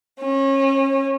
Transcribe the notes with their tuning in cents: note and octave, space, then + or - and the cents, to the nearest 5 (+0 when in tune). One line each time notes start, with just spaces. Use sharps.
C#4 -30